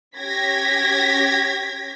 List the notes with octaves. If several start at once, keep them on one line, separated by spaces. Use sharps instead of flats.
C#4 G4 G#6 A#6 B6